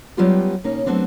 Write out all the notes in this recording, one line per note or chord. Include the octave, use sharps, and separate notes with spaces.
F#3 G3 B3 C#4 F4 G4
B2 A#3 C#4 D#4 C#5
F#3 A3 B3 C4 D4